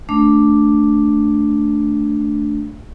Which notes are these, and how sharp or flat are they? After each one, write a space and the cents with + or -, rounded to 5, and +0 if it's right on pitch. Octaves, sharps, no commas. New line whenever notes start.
A3 +5 D4 +0